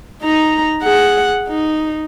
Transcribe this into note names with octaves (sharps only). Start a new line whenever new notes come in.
D#4 A#5
G#4 F#5
D#4